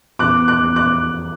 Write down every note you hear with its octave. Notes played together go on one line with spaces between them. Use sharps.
E2 D6 F#6
D6 F#6
E2
D6 F#6